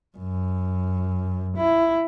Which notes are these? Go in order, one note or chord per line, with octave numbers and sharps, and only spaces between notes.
F#2
E4